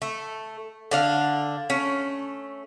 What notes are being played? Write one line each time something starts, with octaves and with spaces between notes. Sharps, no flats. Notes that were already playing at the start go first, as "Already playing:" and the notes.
A3
D3 D4 F5
A3 C#4